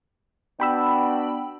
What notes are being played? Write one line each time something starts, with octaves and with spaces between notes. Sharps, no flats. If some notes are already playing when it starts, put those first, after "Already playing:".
B3 D4 F#4 G5 B5 E6